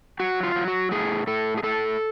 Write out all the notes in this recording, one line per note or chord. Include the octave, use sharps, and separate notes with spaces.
F#3 F#4
F4
F#3
F#4
A2 G#4
A2 A4
G#4
A2 A4